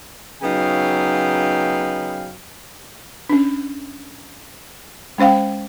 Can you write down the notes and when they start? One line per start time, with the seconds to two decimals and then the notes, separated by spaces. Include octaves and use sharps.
0.42 C#3 F#3 B3 D#4 F5 G5
3.29 C#4 D4
5.18 G#3 C#4 C5 F5 G5